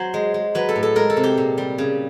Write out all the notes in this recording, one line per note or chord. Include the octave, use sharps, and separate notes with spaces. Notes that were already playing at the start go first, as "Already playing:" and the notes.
Already playing: F#3 C5
G#3
G#3
F#3 B4
A4
A2
A4
G#3 A#4
A4
C3
G4
A#2
G3
C#3